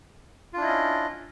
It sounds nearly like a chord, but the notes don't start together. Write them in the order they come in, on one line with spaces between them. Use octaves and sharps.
F4 D4 E4 D#5 C#4